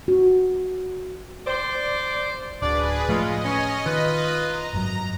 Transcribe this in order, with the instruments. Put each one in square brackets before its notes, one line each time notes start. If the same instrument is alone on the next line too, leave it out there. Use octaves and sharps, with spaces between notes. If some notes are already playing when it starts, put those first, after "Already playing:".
[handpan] F#4
[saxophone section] C5 D5
[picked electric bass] D1 [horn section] D4 F#4 D5 [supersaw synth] G#4 B4
[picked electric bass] A2 F3 A3 [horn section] C#3 G#3 F4 [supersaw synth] D#5
[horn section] C#4
[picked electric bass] D#3 [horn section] F4 B4
[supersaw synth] A#5
[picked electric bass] G#1 F#2 F#3